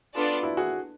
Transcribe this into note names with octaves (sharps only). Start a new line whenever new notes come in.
B3 D4 F4 A4 D5
E4 F#4
F#4 G#4